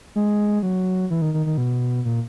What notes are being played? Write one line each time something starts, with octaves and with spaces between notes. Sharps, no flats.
G#3
F#3
E3
D#3
D#3
D#3
B2
A#2